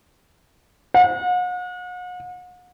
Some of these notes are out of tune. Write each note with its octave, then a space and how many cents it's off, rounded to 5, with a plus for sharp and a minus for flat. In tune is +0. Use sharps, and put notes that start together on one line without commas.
F#5 -40